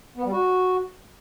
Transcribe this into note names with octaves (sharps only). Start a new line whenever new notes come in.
B3
G3
F#4